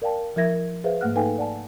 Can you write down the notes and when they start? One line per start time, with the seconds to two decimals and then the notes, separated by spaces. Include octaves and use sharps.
0.02 A#4 D5 F5 G5 A5
0.36 F3 E4 A#4 E5 G#6 A#6
0.84 G#4 B4 C5 E5 F5
1.01 G#2 A3 A#3 F#5 F6 F#6
1.16 D#4 A4 B4 F5 G5 G#5
1.38 D5 F#5 G#5 A5